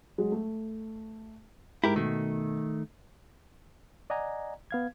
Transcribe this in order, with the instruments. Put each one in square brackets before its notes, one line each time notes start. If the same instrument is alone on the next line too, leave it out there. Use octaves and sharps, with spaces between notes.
[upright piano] F#3 G#3
A3
[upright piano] G#2 [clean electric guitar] E4 G4 A#4
[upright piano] B2 [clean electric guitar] D#3 A3
[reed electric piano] D5 D#5 F#5 G#5 A#5
B3 F5 G#6